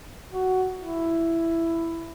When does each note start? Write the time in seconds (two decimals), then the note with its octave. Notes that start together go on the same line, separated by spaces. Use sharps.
0.33 F#4
0.78 E4